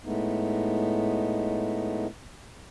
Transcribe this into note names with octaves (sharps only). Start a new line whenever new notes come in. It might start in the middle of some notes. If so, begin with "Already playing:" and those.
A2 G#3 A3 B3 D#4